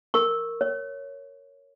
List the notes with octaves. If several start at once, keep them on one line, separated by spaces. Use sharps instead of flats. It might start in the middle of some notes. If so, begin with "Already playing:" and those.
A#4 C#6
C#5